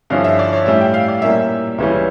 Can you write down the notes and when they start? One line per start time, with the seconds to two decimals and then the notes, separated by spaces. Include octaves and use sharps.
0.10 G2 D3 F3 C#4 E4 F5
0.24 E5
0.39 D5
0.53 C#5
0.66 A2 G3 C#4 E4 E5
0.81 G5
0.94 F5
1.08 D5
1.22 A#2 G3 A#3 C#4 E4 E5
1.78 C#2 C#3 E3 G3 C#4 E5